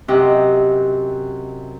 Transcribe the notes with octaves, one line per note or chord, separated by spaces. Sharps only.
F#2 C3 G4 D#5 F#5